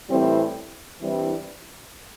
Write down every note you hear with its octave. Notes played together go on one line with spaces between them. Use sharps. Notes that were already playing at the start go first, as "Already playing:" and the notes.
A2 E3 G3 C4
G2 E3 G3 C4 E4